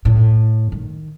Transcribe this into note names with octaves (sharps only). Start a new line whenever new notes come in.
A2
D#3